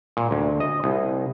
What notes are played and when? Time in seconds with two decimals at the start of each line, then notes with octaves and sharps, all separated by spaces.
0.17 A#2
0.31 D2
0.60 D#5
0.84 C2